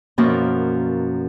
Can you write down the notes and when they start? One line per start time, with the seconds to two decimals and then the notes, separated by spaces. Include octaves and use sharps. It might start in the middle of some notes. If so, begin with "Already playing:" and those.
0.18 F#2 B2 F3 A#3 F#4